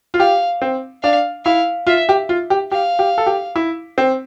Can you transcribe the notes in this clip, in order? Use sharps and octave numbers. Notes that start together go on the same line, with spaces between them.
F4
G4 F5
C4
D4 F5
E4 F5
F4 E5
G4
F4
G4
G4 F5
G4
A4
G4
E4
C4